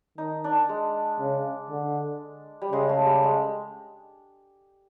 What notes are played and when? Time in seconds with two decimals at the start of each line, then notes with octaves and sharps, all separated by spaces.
0.18 D#3 D#4
0.44 D4
0.69 G#3
1.20 C#3
1.71 D3
2.62 G3
2.72 C#3 G#3
2.89 A3
3.06 G3
3.23 G#3